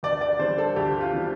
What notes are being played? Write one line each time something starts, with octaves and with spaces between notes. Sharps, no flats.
D2 D5
D5
D3 G3 C5
A4
D2 G4
F4
D3 G3